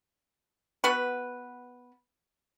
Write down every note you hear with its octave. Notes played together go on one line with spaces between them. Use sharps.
B3 F#4 B4